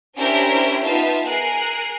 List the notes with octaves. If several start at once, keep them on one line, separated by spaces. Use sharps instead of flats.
C#4 D4 E4 G4 A#4 C5
B3 D#4 F4 E5 A5
G#4 A#4 G#5 F#6 C7